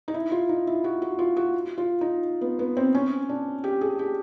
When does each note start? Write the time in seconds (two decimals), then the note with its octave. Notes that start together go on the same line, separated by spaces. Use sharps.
0.08 D#4
0.14 E4
0.32 F4
0.49 D#4
0.67 E4
0.84 F#4
1.02 F#4
1.19 F4
1.37 F#4
1.78 F4
2.01 D#4
2.41 B3
2.59 B3
2.77 C4
2.95 C#4
3.29 D4
3.64 G4
3.81 G#4
3.99 G4